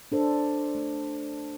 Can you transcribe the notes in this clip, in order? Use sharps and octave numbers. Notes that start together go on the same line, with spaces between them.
D4 A4 C5
A3